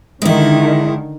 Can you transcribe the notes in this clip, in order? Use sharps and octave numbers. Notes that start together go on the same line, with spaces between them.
D3 D#3 G#3 E4